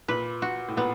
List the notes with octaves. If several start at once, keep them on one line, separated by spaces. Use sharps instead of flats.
A#2 B4
F#4
A2
A#2 B3